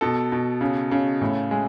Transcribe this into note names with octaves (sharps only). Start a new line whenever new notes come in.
B2 A4
B2
C#3
C#3
A2
G#3